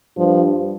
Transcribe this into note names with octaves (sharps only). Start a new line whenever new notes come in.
G2 F3